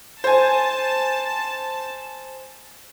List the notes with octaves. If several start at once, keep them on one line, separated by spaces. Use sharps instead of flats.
C5 G#5 A5